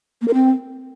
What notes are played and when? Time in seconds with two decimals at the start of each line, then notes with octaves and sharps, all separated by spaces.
0.21 A#3
0.28 A#4
0.34 C4